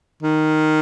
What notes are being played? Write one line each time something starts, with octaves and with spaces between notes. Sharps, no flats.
D#3